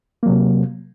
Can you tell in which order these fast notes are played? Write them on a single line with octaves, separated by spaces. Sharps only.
A#3 F#3 C3